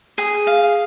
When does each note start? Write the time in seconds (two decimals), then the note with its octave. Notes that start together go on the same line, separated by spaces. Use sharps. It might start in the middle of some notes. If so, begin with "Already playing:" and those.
0.18 G#4
0.47 F5